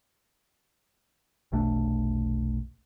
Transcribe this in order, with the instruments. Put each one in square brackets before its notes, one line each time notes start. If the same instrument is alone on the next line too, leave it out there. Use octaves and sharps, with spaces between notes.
[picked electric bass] F1 B1 A3 D4